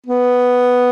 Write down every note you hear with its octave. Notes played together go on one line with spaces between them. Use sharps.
B3